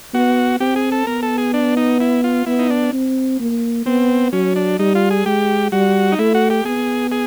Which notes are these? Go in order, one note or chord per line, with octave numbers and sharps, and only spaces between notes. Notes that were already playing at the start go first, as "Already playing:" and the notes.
B3 F#4
C4 G4
G#4
A4
B3 A#4
A4
G#4
D4
D#4
E4
F4
B3 E4
D#4
D4
C4
A#3
B3 C4
F#3 C#4
D4
G3 D#4
F4
G#4
G#3 G4
G3 F#4
D#4
A3 E4
F#4
G4
B3 G#4
G#4